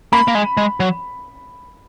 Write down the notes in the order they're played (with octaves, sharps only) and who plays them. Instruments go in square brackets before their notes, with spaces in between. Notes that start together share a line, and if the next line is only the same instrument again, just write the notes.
[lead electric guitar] A#3 [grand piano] B5
[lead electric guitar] A#3
G#3
G#3
F#3